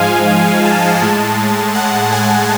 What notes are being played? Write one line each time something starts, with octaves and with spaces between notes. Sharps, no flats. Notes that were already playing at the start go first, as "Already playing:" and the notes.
Already playing: G#2 F3 G#3 F5 G#5
G#5
A5
A2 G#3
F#5
G#5